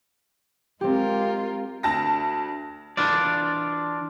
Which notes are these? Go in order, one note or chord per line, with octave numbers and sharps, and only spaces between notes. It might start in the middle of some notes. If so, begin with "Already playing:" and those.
G#3 C4 F4 G4 A#4
D2 A5 A#6
E3 D4 F4 D5